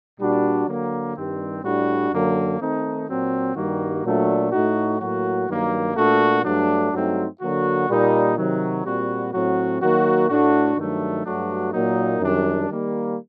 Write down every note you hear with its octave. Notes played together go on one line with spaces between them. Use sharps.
A#2 G3 D4 F#4
D3 F#3 A#3
G2 D#3 G3 C4
A2 G3 D4 F#4
F#2 D3 F#3 A#3
D#3 A3 C4 D#4
A#2 F#3 C4
G2 D#3 G3 A#3 F#4
A#2 F#3 A3 D4
A2 A3 D#4 F#4
A2 F#3 A#3 F#4
G2 D#3 F#3 A#3
A#2 A3 D4 F#4
G2 F#3 A3 D4
G2 F#3 A3 C4 D#4
D3 F#3 A#3 F#4
A#2 G3 A#3 D#4
C3 D#3 F#3
A#2 G3 C4 F#4
A2 F#3 C4 F#4
D#3 F#3 A#3 F#4
A2 A3 D4 F#4
G2 D#3 F#3 A3 D4
G2 F#3 A3 D4 F#4
A#2 F#3 A#3 D#4
F#2 D#3 G3 D4
D#3 G3 A#3